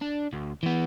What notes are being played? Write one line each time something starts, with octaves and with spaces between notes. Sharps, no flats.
D4
D2
E3 B3